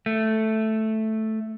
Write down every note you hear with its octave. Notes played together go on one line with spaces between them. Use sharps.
A3